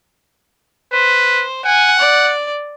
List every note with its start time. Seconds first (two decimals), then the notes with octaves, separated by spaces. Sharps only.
0.92 B4 C5
1.65 F#5 G#5
1.99 D5